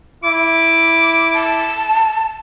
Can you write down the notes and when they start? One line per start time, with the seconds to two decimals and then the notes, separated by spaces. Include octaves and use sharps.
0.24 E4 D6
1.35 A5